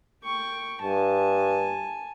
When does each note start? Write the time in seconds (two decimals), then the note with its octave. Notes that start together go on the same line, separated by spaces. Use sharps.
0.24 G5 C#6
0.82 G2 G#5 A5